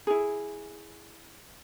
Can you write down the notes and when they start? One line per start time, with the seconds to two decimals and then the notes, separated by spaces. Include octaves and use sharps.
0.07 E4 G#4